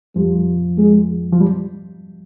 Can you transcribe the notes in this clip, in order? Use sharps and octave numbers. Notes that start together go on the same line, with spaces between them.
F2 F3 G3
G#3
F3
G3